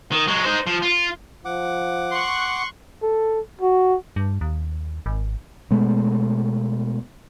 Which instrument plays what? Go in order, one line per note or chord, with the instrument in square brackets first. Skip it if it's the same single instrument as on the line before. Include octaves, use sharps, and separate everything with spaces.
[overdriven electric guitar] D#3
F#3 G#3
D#4 C5
F3
F4
[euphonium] F3 [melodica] F#5 D6
[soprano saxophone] C6 [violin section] C#6 F#6
[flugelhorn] A4
F#4
[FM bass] G2
D#2
G#1
[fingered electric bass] B2 G#3 A3 B3